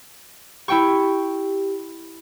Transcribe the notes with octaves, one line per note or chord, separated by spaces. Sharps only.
E4 G4 G5 C#6